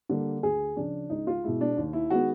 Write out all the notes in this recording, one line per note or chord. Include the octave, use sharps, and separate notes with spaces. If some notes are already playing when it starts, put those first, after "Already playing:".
D3 G3 A#3
D2 G#4
C#3 F3 D4
C#2 D#4
F4
B2 G#3 E4
D4
D#2
E4
D#3 G#3 B3 F#4